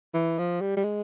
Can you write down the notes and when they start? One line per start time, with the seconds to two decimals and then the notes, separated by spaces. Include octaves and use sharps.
0.14 E3
0.39 F3
0.61 G3
0.77 G3
0.84 G#3